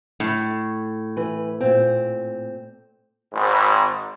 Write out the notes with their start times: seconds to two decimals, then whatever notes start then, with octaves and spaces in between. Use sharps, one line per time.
0.20 A2
1.16 E3 B4
1.61 A#2 C4
3.34 G#1 G#2